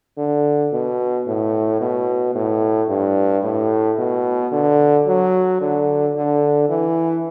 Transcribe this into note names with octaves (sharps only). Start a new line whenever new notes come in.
D3
B2
A2
B2
A2
G2
A2
B2
D3
F#3
D3
D3
E3